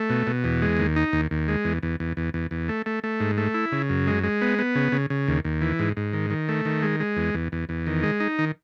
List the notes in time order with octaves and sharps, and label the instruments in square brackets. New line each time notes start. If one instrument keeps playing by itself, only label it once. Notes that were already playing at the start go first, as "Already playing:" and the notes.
Already playing: [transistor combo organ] A3
B2
B2
E2
G#3
D#2
D#4
D#2
D#2
G#3
E2
E2
E2
E2
E2
E2
A3
A3
A3
G#2
A3
E4
C#3
F#2
G#3
G#3
B3
B3
C#3
C#3
C#3
D#2
D#2
E3
G#2
G#2
D#3
D#3
A3
D#3
G#3
G#3
E2
E2
E2
E2
D#3
G#3
D#4
D#3